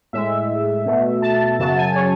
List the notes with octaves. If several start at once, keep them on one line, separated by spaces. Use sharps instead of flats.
A2 G#3 E5
B2 A3
A5
F#2 C#3 F#3 A5
G#5
C#5